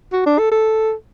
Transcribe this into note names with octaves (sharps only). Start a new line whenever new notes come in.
F#4
D4
A4
A4